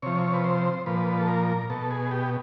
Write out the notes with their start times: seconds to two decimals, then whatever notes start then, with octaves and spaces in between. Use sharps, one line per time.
0.02 C3 F3 C#5
0.34 B4
0.44 C5
0.86 A#2 F3 B4
1.20 A4
1.28 A#4
1.70 B2 A4
1.91 G#4
2.11 G4